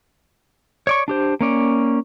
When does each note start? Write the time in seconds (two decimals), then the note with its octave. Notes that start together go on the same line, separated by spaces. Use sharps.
0.87 C#5 D5 C#6
1.08 D4 G4 C5
1.41 A#3 C#4 D5